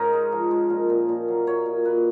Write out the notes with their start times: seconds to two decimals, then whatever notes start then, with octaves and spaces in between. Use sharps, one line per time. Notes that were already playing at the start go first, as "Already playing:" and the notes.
Already playing: G#2 C#4 D#4 A#4
0.13 G#3
0.32 F3
0.51 G#3
0.70 A#2
0.90 A#2
1.09 A#2
1.28 F#3
1.46 F#3 C#5
1.66 A#2
1.85 A#2 B4